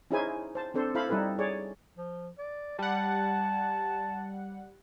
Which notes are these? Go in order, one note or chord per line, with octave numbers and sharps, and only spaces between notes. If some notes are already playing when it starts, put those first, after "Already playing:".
C#4 D#4 E4 G#4 C5 G#5
C5 A5
C4 D4 A4 C5
E4 A4 C5 F5 B5
G3 D#4 E4 A4 B4
G#4 C#5 D5
F3
D5
G3 F#5 A5